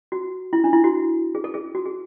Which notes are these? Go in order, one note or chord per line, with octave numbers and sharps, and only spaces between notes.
F#4
E4
D4
E4
F#4
G#4
A4
G#4
F#4
G#4